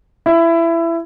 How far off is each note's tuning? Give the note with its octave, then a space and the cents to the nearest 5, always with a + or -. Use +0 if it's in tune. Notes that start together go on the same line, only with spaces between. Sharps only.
E4 +20